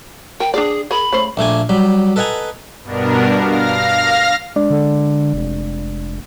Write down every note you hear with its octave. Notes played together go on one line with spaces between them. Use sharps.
A#4 G5
D4 G#4 D5
G#4 A#4 B5
C#3 A3 C5
A#1 A3 A#3 G#5
F#3 G3 B5
A4 B4 D#5 F#5 G#5 A#5
G2 B2 B3 D4 A#4
F5 F6 A#6
G#3 D4 D5
D3
F1